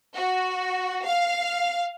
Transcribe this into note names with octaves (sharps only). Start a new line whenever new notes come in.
F#4
F5